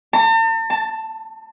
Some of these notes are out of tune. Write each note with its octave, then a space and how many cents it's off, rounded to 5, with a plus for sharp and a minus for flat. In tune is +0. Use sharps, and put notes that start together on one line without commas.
A5 +45
A5 +10